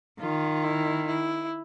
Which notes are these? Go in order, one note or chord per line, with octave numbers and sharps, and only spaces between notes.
D#3 F4
E4
E4